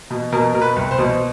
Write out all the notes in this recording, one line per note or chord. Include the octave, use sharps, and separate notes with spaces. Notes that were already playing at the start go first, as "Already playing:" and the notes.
B2
B2 A#4
B2 A#4
B4
C2
C5
B2